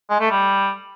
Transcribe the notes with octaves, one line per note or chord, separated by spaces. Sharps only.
G#3
A3
G3